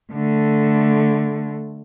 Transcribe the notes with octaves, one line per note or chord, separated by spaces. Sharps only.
D3 A3